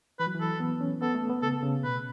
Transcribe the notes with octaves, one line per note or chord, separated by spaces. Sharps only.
E3 B4
F#3
E3
A4
B3
C#4
B3 A4
A3
B3
C#3 A4
C#3
B2 B4